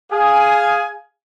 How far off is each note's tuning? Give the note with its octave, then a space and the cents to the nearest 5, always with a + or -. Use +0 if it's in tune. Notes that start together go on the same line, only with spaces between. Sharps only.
G#4 +0 F5 +0 G#5 +15